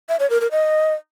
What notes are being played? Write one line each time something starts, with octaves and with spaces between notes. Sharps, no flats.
E5
C#5
A#4
A#4
D#5